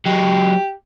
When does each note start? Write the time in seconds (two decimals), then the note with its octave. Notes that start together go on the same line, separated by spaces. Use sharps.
0.06 F#3 G#3 G4